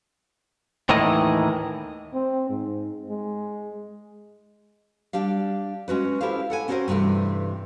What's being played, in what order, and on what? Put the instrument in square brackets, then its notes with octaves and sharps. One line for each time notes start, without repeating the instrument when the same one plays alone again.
[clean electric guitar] D#2 A2 D#3 E3 D#5
[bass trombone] C4
G#2
G#3
[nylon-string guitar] G3 D4 G4 F5
G#3 C#4 F#4 B4
E4 G4 A4 C5 F5
A4 F#5 G#5
C4 C#4 F#4 A4 A#4 C5
G2 C3 E3 A3